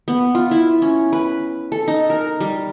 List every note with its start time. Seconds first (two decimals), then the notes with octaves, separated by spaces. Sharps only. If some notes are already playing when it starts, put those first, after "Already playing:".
0.08 B3
0.35 F4
0.51 E4
0.82 C#4
1.13 B4
1.72 A4
1.88 D#4
2.10 A#4
2.41 G3